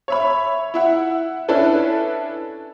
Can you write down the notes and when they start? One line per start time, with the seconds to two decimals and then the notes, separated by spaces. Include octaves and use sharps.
0.08 C#5 E5 B5
0.74 E4 E5 F#5
1.48 C#4 D4 E4 A4 B4